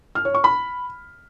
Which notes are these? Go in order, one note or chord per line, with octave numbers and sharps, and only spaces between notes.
F6
C#5
C#6
B5